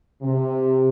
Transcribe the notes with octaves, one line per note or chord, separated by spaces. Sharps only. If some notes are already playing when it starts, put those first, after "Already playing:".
C3